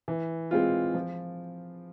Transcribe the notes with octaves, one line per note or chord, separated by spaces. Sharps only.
E3
G#3 C4 F4
F3